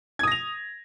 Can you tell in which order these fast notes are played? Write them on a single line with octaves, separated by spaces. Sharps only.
G#6 D#6 A#6 F7